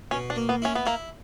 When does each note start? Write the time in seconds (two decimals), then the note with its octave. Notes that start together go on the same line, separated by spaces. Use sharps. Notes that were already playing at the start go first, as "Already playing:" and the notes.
0.11 B2 C#4
0.30 D4
0.36 A#3
0.49 B3
0.62 C#4 E4
0.75 B3
0.86 A#3 E4